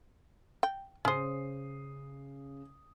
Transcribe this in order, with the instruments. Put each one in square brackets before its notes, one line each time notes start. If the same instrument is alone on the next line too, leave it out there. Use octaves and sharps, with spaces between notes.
[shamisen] G5
[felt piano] C#3 D#6 C7 [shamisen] C#4 C5